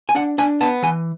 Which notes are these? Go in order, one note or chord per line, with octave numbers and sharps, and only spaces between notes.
G#5
D4 F#5
D4 G#5
B3 A5
E3 G#5